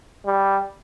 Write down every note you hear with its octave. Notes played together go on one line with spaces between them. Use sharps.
G3